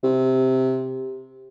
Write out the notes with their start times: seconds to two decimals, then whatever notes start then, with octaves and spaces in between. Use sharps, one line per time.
0.04 C3